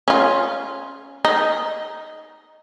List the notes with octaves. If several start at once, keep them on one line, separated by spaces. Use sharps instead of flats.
C#4 F4
D#4